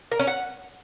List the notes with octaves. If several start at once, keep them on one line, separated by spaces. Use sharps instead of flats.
A#4
C#4
F#5